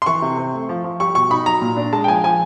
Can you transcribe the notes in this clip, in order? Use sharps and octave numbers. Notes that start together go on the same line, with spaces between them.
C6
E3 C#6
C3
C4
A3
F3
F3
G3 C#6
B2 C#6
D#4 B5
F#3 A#5
A#2
D4
G#3 A5
G5
F3 G#5
F3 G#5